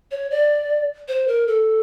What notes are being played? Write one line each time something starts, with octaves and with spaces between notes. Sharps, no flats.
C#5
D5
C5
A#4
A4